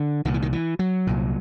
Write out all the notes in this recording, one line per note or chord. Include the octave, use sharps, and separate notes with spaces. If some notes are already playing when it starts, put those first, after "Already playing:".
Already playing: D3
C2 A#2 D#3
E3
D#3
E3
F#3
C2 A#2